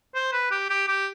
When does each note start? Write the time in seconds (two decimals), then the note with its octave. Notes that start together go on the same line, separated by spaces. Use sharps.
0.15 C5
0.33 B4
0.51 G4
0.70 G4
0.88 G4